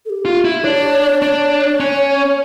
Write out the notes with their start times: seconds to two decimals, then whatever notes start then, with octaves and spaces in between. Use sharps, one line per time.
0.06 A4
0.10 G4
0.25 F4
0.45 E4
0.64 D4 C#5
1.22 D4 C#5
1.80 C#4